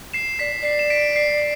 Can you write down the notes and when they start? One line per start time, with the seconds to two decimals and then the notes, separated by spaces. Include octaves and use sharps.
0.14 C7 E7
0.39 D5 B6
0.62 D5 C7
0.79 E7
0.90 B6 D7
1.16 C7